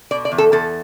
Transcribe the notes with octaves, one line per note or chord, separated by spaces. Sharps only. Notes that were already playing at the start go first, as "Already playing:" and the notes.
B2 D5
D5
E2
A4
E2 A4